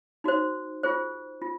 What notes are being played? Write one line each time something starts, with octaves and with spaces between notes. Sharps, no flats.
D#4 F#4 C5
F4 G#4 C5
F4